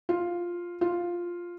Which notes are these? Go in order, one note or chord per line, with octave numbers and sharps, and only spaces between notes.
F4
F4